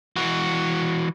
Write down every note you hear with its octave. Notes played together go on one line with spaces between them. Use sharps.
E3 F#4